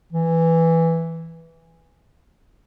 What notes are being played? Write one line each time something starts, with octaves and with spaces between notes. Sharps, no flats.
E3